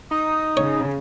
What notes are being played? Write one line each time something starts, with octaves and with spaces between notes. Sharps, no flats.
D#4 D#6
C#3 C#5